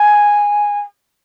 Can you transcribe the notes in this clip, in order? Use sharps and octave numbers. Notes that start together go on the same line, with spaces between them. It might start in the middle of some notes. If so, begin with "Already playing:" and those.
Already playing: G#5